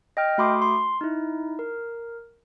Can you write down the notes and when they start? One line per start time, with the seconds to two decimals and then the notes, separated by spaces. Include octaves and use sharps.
0.17 D#5 G5 F6
0.38 A3 F#4 B5 C6 D6 D#6
0.62 C6
1.01 D#4 E4
1.59 A#4